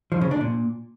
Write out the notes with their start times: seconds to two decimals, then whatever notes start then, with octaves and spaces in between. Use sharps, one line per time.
0.12 F3
0.21 C#3
0.31 D4
0.41 A#2